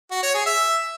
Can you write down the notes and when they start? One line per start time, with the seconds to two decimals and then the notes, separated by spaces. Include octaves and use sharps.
0.11 F#4
0.23 C#5
0.34 G#4
0.46 E5